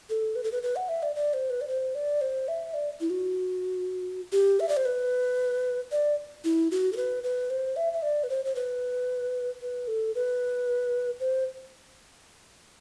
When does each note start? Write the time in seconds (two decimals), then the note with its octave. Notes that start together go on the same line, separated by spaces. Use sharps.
0.10 A4
0.36 B4
0.44 A4
0.52 B4
0.63 B4
0.76 F#5
0.89 E5
1.03 D5
1.16 D5
1.34 C5
1.50 B4
1.61 D5
1.68 C5
1.95 D5
2.21 C5
2.48 E5
2.74 D5
3.01 E4
3.10 F#4
4.32 G4
4.60 E5
4.69 D5
4.77 C5
4.85 B4
5.92 D5
6.44 E4
6.71 F#4
6.93 A4
6.97 B4
7.24 B4
7.50 C5
7.76 E5
7.93 E5
8.02 D5
8.24 B4
8.30 C5
8.45 C5
8.55 B4
9.62 B4
9.88 A4
10.15 B4
11.20 C5